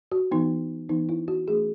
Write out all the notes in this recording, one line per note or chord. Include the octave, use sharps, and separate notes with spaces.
F#4
E3 B3 D#4
E3 B3 D#4
E4
F#4
E3 A3 C#4 G#4